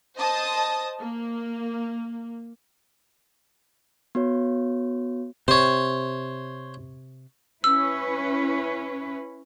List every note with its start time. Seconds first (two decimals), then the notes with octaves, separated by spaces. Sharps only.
0.17 C5 D#5 A5 D#6
1.00 A#3
4.15 B3 F#4 C#5
5.48 C3 C5 C#5
7.64 C#4 E4 B4 E6